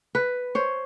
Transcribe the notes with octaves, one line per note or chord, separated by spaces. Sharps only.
B4
C5 C#5